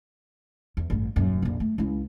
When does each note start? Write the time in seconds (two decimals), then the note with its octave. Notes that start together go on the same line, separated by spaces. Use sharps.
0.77 E2
0.90 A1 G2
1.16 D#1 F#2
1.42 A#1 F2
1.60 A3
1.78 C#2 E4